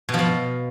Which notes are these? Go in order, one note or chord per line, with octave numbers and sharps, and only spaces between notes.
B2
F3
B2